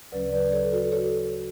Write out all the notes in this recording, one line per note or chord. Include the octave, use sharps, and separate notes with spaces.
D2 C#3 F#3 C#4 B4 D5
B4 D5
A4 C#5
F#4 A4
A4 C#5